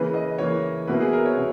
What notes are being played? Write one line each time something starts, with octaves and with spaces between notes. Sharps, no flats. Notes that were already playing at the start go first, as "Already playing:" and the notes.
Already playing: C#3 E3 A#3 B4
D#5
C#3 E3 A#3 C#5
B2 A#3 E4 B4
G#4
A#4
C#5
B2